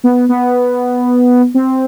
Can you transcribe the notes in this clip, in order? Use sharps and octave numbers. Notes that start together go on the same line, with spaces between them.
B3
B3
C4